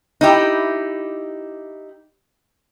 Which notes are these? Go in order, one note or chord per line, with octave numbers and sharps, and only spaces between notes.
D#4 E4 G4